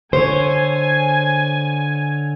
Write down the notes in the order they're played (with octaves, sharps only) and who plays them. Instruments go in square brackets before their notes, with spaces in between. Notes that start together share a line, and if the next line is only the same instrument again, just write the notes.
[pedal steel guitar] D3 C#5 [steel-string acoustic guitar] C5 [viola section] G#5